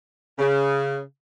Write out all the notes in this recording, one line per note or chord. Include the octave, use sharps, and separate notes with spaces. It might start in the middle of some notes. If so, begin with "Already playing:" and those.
C#3